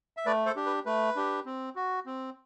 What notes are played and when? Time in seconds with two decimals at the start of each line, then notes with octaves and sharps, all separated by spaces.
0.17 E5
0.26 A3 B4 D5
0.46 A4 C5
0.56 D4 G4
0.66 B4
0.86 A3 B4
1.16 D4 G4
1.46 C4
1.76 F#4
2.06 C4